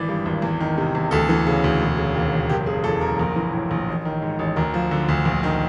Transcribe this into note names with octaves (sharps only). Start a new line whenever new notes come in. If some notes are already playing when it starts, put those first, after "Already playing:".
Already playing: G#1 E3 D5
G2
G#1
E2
D#3
C3
E2
D2 A4
E3
C#3
D2
E1
C#3
D#2
E1
F#1 G4
C#3 G#4
E2 A4
F#1 A#4
A#1
E3
A2
A#1
A1
D#3
G#2
A1
D2 A#4
F3
D3
D2
A#1
D#3